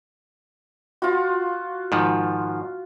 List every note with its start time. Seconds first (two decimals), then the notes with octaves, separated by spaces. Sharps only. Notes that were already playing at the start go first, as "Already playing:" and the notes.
1.02 F4 F#4
1.92 G#2 D#3 F3